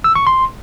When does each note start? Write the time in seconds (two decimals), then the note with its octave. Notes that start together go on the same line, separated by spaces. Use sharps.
0.04 E6
0.16 C#6
0.27 C6